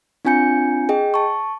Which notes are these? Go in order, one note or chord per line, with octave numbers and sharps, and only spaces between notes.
C4 D4 F4 G#5 G6 C#7
G#4 D#5 G5
A5 C#6